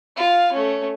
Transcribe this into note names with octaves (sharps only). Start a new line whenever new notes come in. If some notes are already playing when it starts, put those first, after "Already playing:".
F4 F5
A3 C#4